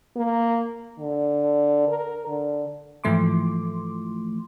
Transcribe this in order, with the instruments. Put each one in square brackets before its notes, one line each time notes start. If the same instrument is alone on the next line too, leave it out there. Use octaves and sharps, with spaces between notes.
[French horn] A#3
D3
A#4
D3
[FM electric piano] G#2 E3 F3 A3 C6 D6